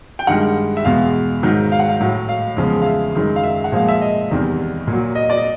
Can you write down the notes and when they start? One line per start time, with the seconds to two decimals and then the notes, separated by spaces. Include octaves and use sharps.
0.19 G5
0.27 G2 D#3 G#3 F#5
0.77 E5
0.85 E2 B2 G#3 F5
1.43 G#2 D#3 F#3
1.72 F5
1.79 F#5
1.89 F5
2.01 A2 F#3
2.29 F5
2.57 E2 C#3 F3 G#3
2.82 F5
2.86 E5
3.15 F#2 D#3 G#3
3.36 F5
3.44 E5
3.64 F#5
3.72 A#2 F3 G#3 F5
3.89 E5
4.01 D#5
4.30 E2 C3 D#3 G3
4.87 A#2 F#3
5.15 D#5
5.30 D5
5.37 D#5